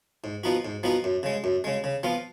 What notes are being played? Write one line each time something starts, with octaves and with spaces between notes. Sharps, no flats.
G#2
F3 B3 D#4 F#4
G#2
F3 B3 D#4 F#4
F#2
C#3 G#3
F#2
C#3 G#3
C#3
F3 B3 F4